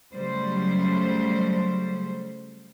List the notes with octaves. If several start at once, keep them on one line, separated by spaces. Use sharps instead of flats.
C#3 F#3 G3 A3 C5